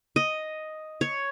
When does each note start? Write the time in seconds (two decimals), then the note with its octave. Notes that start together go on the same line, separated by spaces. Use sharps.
0.16 D#5
1.01 C#5